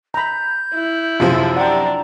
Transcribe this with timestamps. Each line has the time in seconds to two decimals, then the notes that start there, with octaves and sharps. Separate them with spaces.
0.14 A#5 B5 G6
0.74 E4
1.20 F#2 C3 F3 F4 G#4 C5
1.57 D4 F#5 G5 A#5